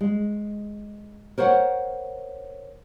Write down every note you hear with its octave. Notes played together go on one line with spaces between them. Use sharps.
G#3
A#4 C5 C#5 F#5